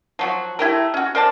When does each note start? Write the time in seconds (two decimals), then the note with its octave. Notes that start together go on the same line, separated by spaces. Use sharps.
0.19 F3 F#3 F#4
0.59 A3 E4 G4 A#4
0.94 C#4 F#4
1.15 A#4 C5 D5 A5